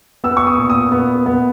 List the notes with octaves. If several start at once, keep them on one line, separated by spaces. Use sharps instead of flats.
B3 E6
C#6
D#6
A#2
D#6
B3
B3